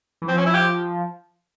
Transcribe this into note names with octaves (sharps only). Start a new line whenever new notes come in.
E3
F3 C4
C#4
E4
G4